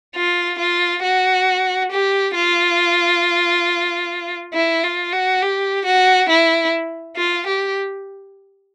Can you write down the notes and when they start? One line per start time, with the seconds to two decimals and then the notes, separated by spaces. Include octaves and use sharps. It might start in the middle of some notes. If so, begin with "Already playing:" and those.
0.15 F4
0.59 F4
1.03 F#4
1.91 G4
2.35 F4
4.54 E4
4.83 F4
5.13 F#4
5.42 G4
5.86 F#4
6.29 E4
7.17 F4
7.47 G4